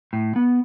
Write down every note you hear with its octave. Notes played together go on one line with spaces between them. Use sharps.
A2
B3